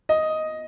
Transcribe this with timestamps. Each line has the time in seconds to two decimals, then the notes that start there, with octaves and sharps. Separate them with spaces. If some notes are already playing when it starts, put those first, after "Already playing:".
0.09 D#5